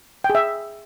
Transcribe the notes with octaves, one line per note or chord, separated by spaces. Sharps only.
G5
G#4
E5